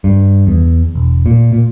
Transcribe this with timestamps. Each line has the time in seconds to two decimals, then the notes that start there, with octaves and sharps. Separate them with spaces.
0.04 G2
0.47 E2
0.95 E1
1.26 A#2
1.53 A#2